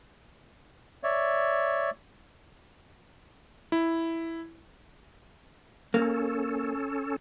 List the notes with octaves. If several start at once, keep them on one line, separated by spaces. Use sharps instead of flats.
C#5 D5 E5
E4
A#3 C#4 A4